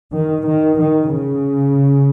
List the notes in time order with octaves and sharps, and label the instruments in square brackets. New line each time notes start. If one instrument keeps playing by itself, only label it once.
[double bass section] D#3
D#3
D#3
C#3